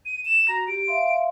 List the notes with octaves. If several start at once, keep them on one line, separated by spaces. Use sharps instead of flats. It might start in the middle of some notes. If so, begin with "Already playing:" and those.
D#7
E7
F#4 A#5
G4 D7
E5 F5 C6